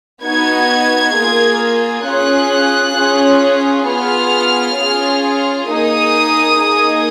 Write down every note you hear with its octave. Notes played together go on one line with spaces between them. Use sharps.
B3 D#4 F#4 G#6
A#3 F4 G#4
C#4 F4 G#4 F#6
C#4 F4 G#4
B3 F4 G#4 F6
C#4 F4 G#4
A#3 D#4 G#4 D#6
A#3 D#4 G#4